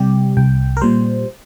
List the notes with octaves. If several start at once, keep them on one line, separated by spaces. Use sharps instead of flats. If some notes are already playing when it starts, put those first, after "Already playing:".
Already playing: C3 G3 G4
C2 G5
A#4
A#2 G3 C5